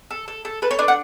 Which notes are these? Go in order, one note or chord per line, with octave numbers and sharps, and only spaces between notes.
A4
A4
A4
A4 B4
C#5
D4 B4
F#5